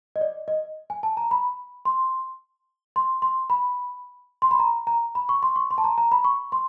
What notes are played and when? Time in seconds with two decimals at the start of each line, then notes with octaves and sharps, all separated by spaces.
0.16 D#5
0.21 D5
0.48 D#5
0.90 G#5
1.03 A5
1.17 A#5
1.31 B5
1.85 C6
2.96 C6
3.22 C6
3.50 B5
4.42 C6
4.51 B5
4.60 A#5
4.87 A#5
5.15 B5
5.29 C#6
5.43 C6
5.56 C#6
5.71 C6
5.78 A5
5.84 A#5
5.98 A#5
6.12 B5
6.25 C#6
6.52 C6